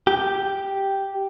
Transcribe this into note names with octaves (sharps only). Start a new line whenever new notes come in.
G4